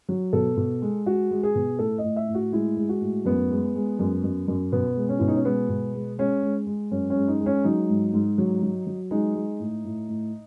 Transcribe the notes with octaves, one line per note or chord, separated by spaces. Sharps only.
F#3
B2 A4
B2
G#3
G#3 F#4
G#3
G#4
B2
A2 A4
D#5
A2
E5
A2
F#4
G#3 E4
G#3
F#4
A2
F#2 B3
G#3
G#3
F#2
F#2
F#2
B2 B3
G#3
C#4
B2 E4
D#4
C#4
G#3 B3
B2
G#3
G#3 C#4
G#3
G#3
F#2 C#4
C#4
G#3
D#4
G#3
C#4
F#3 D#4
G#2
G#2
F#3
F#3
F#3
G#3 D#4
G#3
A2
A2
A2